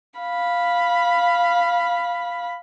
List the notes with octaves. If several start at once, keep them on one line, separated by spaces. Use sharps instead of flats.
F5 B5